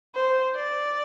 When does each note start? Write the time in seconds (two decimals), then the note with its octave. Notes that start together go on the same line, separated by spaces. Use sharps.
0.15 C5
0.55 D5